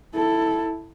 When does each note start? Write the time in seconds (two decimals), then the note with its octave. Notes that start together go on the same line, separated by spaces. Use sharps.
0.14 E4 A4